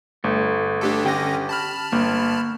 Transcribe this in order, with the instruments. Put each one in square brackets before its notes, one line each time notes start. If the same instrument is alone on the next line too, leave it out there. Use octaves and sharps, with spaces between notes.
[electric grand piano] G1 [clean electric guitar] A3
[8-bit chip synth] D4 G4 A4
[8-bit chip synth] D3 C#4 A#6 [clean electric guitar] G4 G5
[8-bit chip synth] A5 B5 F6
[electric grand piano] G1 [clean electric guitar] A#3